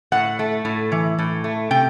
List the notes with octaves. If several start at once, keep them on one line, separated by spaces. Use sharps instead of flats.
A2 F#5
A3
A2
E3
A2
A3
C3 G5